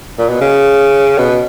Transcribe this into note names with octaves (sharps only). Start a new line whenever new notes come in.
A#2
B2
C#3
B2